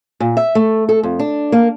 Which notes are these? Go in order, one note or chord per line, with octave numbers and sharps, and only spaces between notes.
A#2
E5
A3
A4
F2
D4
A#3